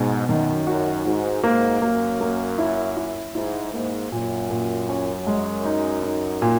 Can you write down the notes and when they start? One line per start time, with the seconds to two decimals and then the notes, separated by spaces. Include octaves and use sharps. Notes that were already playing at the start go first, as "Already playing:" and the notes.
Already playing: G#2 B2
0.28 F#2 D#3
0.67 F#2 F#4
1.05 G#2 F#4
1.43 G#2 A#3
1.82 F#2 A#3
2.21 A#3
2.58 E4
2.97 E4
3.35 G#2 E4
3.73 G#2 A#3
4.12 F#2 A#2
4.50 A#2
4.89 C#4
5.27 G#3
5.65 D#4
6.03 D#4
6.42 A#2